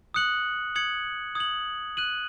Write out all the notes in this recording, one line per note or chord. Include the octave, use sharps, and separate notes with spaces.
D#6 F#6 C#7 F#7
D#6 G#6 C#7 F#7
D#6 G#6 C#7 F#7
F#6 D#7 F#7